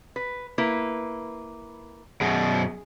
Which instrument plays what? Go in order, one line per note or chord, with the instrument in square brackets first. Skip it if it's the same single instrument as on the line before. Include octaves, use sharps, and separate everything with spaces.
[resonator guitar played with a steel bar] B4
A#3 E4 B4
[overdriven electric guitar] F#2 B2 [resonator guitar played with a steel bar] G#4